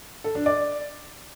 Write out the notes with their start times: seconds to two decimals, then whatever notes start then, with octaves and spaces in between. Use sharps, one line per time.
0.24 A4
0.35 D4
0.46 D5